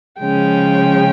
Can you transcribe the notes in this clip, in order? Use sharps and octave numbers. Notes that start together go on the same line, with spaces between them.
C#3 F3 G#3 C#4 G5